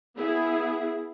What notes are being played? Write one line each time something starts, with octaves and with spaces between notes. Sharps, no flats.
B3 E4 G#4